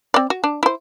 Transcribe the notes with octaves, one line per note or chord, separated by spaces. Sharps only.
C4 D5
F#4
D4
E4 C5